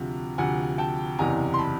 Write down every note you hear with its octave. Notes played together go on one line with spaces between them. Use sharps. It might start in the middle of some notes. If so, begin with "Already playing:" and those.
Already playing: D2 C3 F3
D2 C3 F3 F#5 G#5
G5 A5
F#1 E2 C3 E3 G#5 A#5
C6
A5 B5